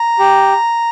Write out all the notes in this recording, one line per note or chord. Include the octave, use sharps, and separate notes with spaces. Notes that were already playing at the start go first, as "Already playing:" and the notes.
Already playing: A#5
G4